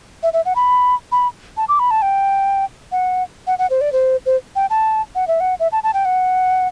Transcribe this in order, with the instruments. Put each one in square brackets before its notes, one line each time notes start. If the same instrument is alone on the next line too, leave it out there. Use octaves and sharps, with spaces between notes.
[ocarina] E5
E5
F#5
B5
B5
A5
D6
B5
A5
G5
F#5
F#5
F#5
C5
D5
C5
C5
G5
A5
F#5
E5
F#5
E5
A5
A5
G5
F#5